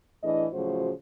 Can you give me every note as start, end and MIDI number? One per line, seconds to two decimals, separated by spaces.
0.23 0.45 45
0.23 0.45 52
0.23 0.45 62
0.23 0.45 68
0.23 0.45 75
0.52 0.91 45
0.52 0.91 49
0.52 0.91 53
0.52 0.91 54
0.52 0.91 66
0.52 0.91 72